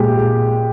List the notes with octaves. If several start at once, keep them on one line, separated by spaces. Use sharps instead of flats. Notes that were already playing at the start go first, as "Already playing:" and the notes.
Already playing: A#2 G#3 G4